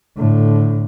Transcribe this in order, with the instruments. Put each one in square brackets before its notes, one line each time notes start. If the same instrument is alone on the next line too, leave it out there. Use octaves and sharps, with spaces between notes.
[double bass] A2 D3